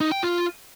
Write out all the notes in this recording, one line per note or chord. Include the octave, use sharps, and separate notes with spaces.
D#4
G5
F4